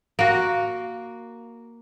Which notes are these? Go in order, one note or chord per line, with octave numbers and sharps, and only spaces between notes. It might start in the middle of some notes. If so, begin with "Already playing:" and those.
A#3 F#4